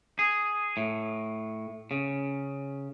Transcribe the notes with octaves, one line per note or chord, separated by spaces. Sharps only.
G#4
A2
C#3